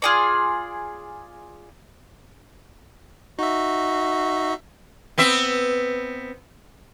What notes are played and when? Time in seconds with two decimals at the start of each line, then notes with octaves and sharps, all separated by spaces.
0.02 F4 G#4 D5
3.39 D#4 F#4 E5
5.18 B3 C4 E5